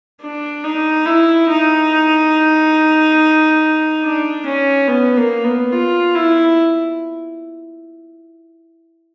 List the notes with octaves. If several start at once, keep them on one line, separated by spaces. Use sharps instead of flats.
D4
D#4
E4
D#4
D4
C#4
B3
A#3
B3
F4
E4